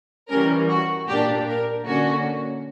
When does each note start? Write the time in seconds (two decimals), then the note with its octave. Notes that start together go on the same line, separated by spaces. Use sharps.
0.29 E3 G3 C#4 A#4
0.69 F#4
1.07 A#2 A#3 D4 G4
1.47 A#4
1.85 D3 A#3 C#4 F#4